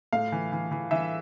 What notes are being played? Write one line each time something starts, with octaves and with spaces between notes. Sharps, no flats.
A2 F5
E3
E3
E3
E3 E5